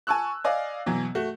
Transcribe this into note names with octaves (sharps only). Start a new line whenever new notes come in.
G#5 A5 C#6 E6 F#6
D5 D#5 F5 G#5
B2 E3 F#3
A3 F#4